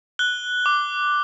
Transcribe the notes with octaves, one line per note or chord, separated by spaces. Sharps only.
F#6 G7
D6